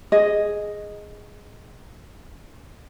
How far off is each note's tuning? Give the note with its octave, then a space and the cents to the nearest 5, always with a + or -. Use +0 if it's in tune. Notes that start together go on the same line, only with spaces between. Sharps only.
G#4 +0 D#5 +0